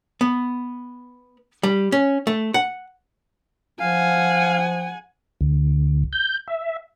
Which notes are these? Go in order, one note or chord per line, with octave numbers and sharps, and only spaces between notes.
B3
G3
C#4
A3
F#5
F3 F5 F#5 G#5
D2
G6
E5